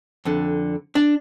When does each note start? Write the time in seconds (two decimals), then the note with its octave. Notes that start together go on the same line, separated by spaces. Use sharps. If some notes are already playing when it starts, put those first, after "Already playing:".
0.25 F2 D3
0.95 D4